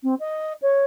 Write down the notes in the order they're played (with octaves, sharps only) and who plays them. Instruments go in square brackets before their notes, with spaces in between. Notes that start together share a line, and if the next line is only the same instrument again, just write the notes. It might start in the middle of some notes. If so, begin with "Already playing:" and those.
[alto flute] C4
D#5
C#5